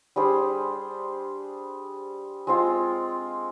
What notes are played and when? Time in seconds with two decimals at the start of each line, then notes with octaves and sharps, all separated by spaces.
0.16 G3 D4 G#4 C5
2.47 G#3 C4 F4